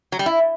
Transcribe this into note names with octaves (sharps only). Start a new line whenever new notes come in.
F#3
G3
E4